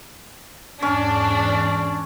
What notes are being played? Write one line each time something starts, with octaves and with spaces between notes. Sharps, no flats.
E2 G#2 C#4 D4 D5